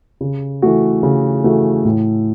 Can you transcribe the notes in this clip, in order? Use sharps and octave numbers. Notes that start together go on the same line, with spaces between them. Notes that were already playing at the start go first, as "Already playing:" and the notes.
C#3
E3 A3 F#4
C#3
E3 A3 F#4
A2